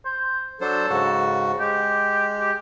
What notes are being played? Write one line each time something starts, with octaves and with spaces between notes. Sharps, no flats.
C5
F#3 D4 A4 C5
G#2 C#3 F#4
G#3 G4
G4